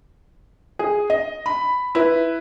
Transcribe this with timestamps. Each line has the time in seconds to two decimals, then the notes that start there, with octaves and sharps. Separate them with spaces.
0.79 G#4
1.10 D#5
1.46 B5
1.95 E4 B4